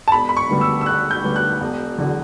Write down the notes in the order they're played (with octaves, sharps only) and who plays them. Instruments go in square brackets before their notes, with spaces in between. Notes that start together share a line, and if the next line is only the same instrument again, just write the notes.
[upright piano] A5
E1 B5
B5
C#6
D2 D3 G3 B3
E6
E6
E1 F#6
G6
D2 D3 G3 B3
F#6
E1
E2 D3 F#3